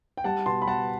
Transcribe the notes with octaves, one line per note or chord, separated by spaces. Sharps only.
G5
G3 F#5 A5
B2 A5 C6
B5
G3 F#5 A5